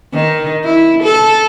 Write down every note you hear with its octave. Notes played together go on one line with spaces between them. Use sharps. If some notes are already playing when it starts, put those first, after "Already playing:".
D#3
E4
A4